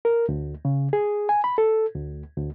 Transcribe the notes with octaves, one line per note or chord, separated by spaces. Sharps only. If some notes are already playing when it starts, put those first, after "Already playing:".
A#4
D2
C#3
G#4
G#5
B5
A4
D2
D2